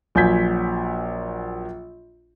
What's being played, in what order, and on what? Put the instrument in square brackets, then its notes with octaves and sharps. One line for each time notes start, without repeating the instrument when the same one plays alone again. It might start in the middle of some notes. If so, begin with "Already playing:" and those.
[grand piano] A#1 F#3 G#5 G6 G#6 B6